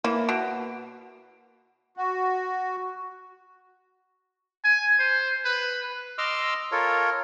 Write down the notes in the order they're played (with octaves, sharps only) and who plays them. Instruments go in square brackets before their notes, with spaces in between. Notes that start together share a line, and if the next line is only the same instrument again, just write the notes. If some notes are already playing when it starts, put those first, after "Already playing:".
[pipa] E3 [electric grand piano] A#3
[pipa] B2 [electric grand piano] D7
[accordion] F#4
[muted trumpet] G#5
C5
B4
[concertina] D#5 C6 D6 E6 F6
F4 A4 A#4 C#5